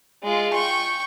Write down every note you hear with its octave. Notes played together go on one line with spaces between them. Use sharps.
G#3 F4
G5 C#6